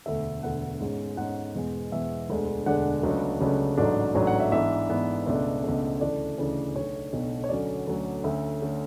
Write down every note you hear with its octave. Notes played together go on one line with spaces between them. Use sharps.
E1 D2 D3 A3 E5
E1 D2 D3 A3 F#5
G#2 G#3 C#4
G#2 G#3 C#4 F#5
E2 B2 G#3
E2 B2 G#3 E5
E1 D2 D3 G#3 D4
E1 D2 D3 G#3 D4 F#5
C#2 C#3 F#3 A3 D4
C#2 C#3 F#3 A3 D4
A1 G#2 F#3 A3 D4
A1 G#2 F#3 A3 D4
F#5
E5
G#2 E3 B3 D4 E5
G#2 E3 B3 D4
C#2 B2 A3 D4 E5
C#2 B2 A3 D4
D2 C#3 E3 A3 D4 D5
D2 C#3 E3 A3 D4
B1 B2 A3 D4 C#5
B1 B2 A3 D4
C#5
D2 D3 F#3 A3 C#4 D5
D2 D3 F#3 A3 C#4
D2 D3 A3 C#4 E5
D3 A3 C#4